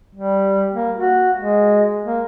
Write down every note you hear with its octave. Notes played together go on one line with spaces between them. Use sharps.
G3
A#3
F#4
G#3
A#3